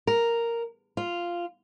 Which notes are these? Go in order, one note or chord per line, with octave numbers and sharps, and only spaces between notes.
A#4
F4